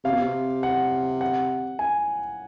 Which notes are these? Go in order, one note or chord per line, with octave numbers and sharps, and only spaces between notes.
C3 F5
B2
C3
F#5
F#5
G#5